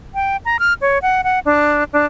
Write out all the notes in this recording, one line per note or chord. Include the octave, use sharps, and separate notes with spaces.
G5
A#5
F6
C#5
F#5
F#5
D4
D4